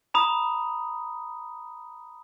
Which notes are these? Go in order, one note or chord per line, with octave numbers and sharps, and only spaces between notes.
A#5 B5 D#6